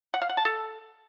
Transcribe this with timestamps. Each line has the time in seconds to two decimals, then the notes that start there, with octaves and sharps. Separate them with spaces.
0.14 F#5
0.22 F5
0.29 F#5
0.37 A5
0.45 A4